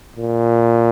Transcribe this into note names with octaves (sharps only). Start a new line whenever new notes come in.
A#2